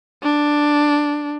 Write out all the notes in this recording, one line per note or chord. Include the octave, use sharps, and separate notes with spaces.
D4